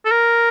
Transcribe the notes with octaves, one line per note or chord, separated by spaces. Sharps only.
A4
A#4